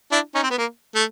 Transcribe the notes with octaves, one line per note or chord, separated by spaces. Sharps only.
D4 E4
C#4 D#4
C4
B3
A#3
A3